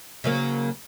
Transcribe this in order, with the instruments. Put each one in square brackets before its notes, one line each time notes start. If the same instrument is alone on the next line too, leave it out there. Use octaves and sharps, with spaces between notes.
[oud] C#3 F#3 A#3